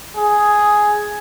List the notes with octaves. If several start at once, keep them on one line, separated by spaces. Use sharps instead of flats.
G#4